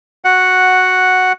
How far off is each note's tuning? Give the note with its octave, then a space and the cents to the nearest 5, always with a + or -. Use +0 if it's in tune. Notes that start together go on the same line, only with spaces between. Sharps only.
F#4 -5 F#5 +0